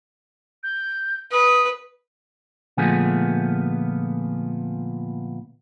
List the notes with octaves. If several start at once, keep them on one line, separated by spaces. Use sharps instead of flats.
G6
B4 D#6
A#2 D3 F3 A3 B3 G#4